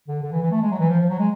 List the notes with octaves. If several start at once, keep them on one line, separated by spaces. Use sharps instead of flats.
D3
D3
E3
E3
A3
G#3
F#3
E3
F3
F3
F#3
G#3